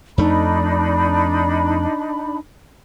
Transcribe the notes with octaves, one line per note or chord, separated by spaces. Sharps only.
F2 A3 D4 D#4 B5